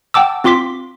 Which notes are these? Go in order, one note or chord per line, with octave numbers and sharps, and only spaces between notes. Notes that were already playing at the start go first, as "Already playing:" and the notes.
F#5 G5 A5 D6 E6
C4 F4 C6 D6 B6